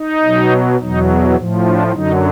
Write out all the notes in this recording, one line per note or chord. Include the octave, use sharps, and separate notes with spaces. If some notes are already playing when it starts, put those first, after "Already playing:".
Already playing: D#4
B2 F#3
E2 B2 F#3 D#4
A2 F3
D4
F#2 D3 F#3 D#4